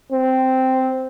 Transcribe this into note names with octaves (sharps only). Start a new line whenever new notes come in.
C4